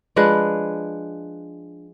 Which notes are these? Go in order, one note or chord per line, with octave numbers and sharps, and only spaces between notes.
F3 G#3 D4 B4